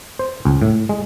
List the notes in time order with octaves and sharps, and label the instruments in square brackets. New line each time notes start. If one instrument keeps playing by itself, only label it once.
[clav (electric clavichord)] C5
C#2
A2
G#3